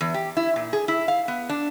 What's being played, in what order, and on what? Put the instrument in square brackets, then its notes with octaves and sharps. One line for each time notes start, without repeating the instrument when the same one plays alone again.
[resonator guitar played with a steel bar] E2
G4
E4
A#2
G#4
E4
F5
B3
D4